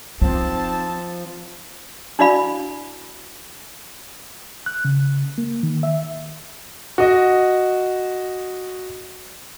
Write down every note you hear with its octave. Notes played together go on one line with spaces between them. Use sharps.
F3 C4 D#4 A5
D4 E4 F#4 D5 F5 B5
F#6
C#3
A#3
D#3
E5
F#4 D#5